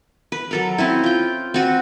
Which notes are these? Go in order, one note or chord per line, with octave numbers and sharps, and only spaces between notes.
B4
F#3 A4 A#4
C4 C#4 E4
F4 G5
C4 F#4 B4